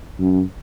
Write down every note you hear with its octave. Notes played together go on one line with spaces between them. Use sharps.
F#2